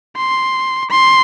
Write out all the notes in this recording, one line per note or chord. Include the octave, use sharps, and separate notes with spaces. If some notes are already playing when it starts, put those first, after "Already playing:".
C6
C6